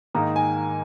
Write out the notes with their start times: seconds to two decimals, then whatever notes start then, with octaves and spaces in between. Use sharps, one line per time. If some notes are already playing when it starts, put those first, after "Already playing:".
0.14 G#2 D#3 A#3 D#4 A#5
0.36 G#5